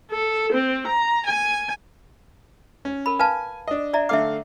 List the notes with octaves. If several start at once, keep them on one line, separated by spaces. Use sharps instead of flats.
A4
C4
A#5
G#5
C#4
A#4 B5
B4 F5 G#5 A5
D4 D#5
D5 E5 A#5
D3 A3 E5 F5 D6